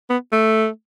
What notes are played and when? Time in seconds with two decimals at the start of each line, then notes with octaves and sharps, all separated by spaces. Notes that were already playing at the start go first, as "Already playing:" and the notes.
0.10 B3
0.32 A3